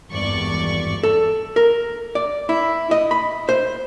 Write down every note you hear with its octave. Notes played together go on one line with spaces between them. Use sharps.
G#1 E2 G2 D5 C#6
A4
A#4
D5
E4
D#5
B5
C5